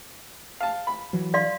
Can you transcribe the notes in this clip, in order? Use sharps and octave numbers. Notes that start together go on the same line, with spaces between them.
F5 A5
B5
E3 F#3
D5 F5 C6